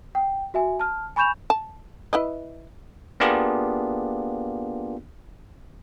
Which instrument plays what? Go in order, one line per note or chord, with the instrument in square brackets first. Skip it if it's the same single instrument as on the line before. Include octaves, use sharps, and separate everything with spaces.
[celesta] G5
F#4 E5 G#5
A5 F6
G#5 B5 C#6 G6 E7 F7
[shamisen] A5
E4 B4 D#5
[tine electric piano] A#3 B3 D4 F4 G4 G#4